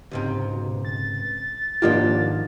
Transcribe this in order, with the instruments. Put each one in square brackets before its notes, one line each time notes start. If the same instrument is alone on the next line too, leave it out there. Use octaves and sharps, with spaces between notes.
[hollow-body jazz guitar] C#2 G#2 C3
[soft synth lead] B2
A6
[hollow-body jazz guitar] D#2 G#2 G4 [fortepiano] F3 A#3 D4